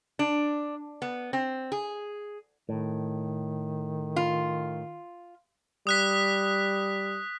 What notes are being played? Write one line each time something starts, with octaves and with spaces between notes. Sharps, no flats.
D4
B3
C4
G#4
A2 D#3
F4
G3 D#6 F#6 B6